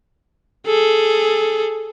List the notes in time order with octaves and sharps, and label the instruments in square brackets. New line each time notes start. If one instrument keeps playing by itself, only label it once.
[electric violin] G#4 A4